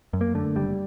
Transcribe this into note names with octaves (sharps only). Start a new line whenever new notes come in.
F#2
A#3
D3 A3
F#1 G3